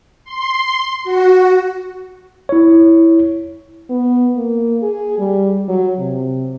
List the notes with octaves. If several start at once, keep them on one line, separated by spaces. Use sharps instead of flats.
C6
F#4
E4 C#5
B3
A#3
G#4
G3
F#3
C3